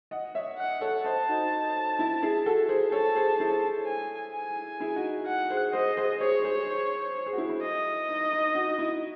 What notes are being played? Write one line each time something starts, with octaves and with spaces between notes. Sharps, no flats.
D#5 F#5
C#5 E5
F#5
A4 C#5
C5 D#5 A5
D#4 F#4
E4
E4 G#4
F#4 A4
G#4 C5
A4 C#5 A5
G#4 C5
E4 G#4
G#5
G#5
E4 G#4
D#4 F#4
F#5
G#4 C5
G#4 C5 D#5
G#4 C5
G#4 C5 C#5
G#4 C5
G#4 C5
F#4
E4 G#4
E4
D#5
D#4
D#4
D#4 F#4
E4